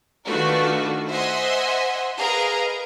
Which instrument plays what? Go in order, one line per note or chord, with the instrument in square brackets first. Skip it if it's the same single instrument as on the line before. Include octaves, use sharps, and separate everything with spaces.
[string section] D#3 A3 D4 F4 F#4 B4
C5 D#5 E5 F#5 G#5 C6
G#4 A#4 B4 D#5 F5 A#5